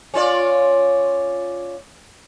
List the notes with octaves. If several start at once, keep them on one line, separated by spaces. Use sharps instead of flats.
C#4 F4 D5